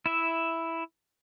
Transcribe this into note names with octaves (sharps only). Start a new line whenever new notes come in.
E4 E5